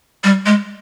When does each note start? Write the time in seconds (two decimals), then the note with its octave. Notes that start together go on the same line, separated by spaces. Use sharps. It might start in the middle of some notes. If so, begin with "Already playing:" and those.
0.24 G3
0.46 G#3